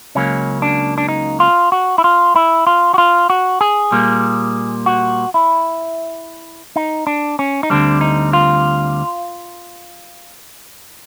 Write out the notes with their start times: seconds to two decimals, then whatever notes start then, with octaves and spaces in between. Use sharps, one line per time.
0.15 C#2 C#3 F#3 A#3 C#4
0.62 D4
0.98 D4
1.09 D#4
1.40 F4
1.72 F#4
1.98 E4
2.04 F4
2.36 E4
2.67 F4
2.94 F#4
2.98 F4
3.30 F#4
3.61 G#4
3.92 A#2 G3 A#3
4.86 F#4
5.34 E4
6.76 D#4
7.07 D4
7.39 C#4
7.63 D#4
7.70 D2 D3 G3 C4 D4
8.01 D#4
8.33 F4